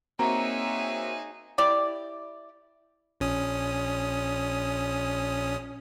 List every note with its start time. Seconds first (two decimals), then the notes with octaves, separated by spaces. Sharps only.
0.19 A#3 C4 D#4 F#4 G#4 C#5 E5 A#5
1.58 E4 G4 D5
3.20 A#1 C#4 D#6